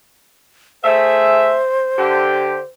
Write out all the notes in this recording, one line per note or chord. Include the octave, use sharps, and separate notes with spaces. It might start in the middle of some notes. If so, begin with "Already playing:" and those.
A3 G#4 C5 E5
D3 G4